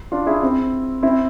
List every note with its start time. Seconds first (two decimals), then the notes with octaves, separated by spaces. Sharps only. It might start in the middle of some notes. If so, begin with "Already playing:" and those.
0.12 D4 F4
0.26 E4 G#4
0.43 C4 E4
1.02 C4 E4